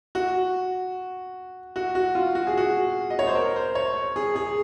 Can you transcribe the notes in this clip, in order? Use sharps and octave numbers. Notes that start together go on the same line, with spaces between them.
F#4
F#4
F#4
F4
F#4
G#4
F#4
D#5
C#5
C5
A#4
C5
C#5
G#4
G#4